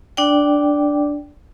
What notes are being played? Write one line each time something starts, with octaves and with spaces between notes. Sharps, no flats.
D4 D5 G5